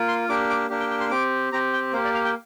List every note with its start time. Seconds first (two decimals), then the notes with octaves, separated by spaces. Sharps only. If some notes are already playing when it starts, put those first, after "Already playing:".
Already playing: A#3 F4
0.08 C6
0.29 A#3 D4 G4 D6
0.50 D6
0.70 A#3 D4 G4
0.80 G5
0.91 G5
1.00 C6
1.11 C4 G4 D6
1.52 C4 G4 A#5
1.73 G5
1.93 A#3 G4 C5
2.04 D5
2.14 F5
2.25 G5